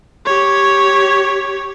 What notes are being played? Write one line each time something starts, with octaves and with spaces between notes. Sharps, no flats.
G4 C#5